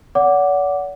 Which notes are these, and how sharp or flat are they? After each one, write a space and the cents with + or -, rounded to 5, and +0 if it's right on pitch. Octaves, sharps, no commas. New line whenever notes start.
D5 -45 F#5 +0 D6 +0